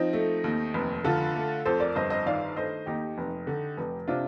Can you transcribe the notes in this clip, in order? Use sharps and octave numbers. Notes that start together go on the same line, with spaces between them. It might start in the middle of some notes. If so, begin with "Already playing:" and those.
Already playing: F3 C4 D#4
A3
D#2
F1
D3 F4 A4
A3
F2 A4 C5
A#4 D5
G1 C5 D#5
C5 D#5
D#3 D5 F5
A3 C5 D#5
D#2 D#4 G4
F1
D3
F1
C3 D4 F4